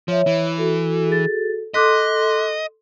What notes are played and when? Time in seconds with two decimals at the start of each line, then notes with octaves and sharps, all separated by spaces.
0.08 F3 C#5 E5
0.27 E3
0.58 F#4 A4
1.08 G#4 A6
1.74 A4 D#5 C6 D6 F#6 B6